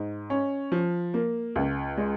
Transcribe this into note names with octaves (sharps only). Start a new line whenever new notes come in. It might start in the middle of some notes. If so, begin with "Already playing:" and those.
Already playing: G#2
C#4
F3
A#3
C#2
G#3